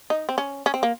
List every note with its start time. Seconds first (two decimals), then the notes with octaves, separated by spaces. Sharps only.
0.10 D#4
0.29 C4
0.38 C#4
0.66 C#4
0.74 C4
0.83 A#3